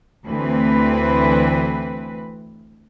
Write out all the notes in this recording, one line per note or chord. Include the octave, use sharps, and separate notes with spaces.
D2 E3 C4 B4